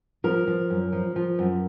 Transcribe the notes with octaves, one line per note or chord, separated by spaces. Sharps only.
F3 A#4
F3
F#2
F3
F3
F#2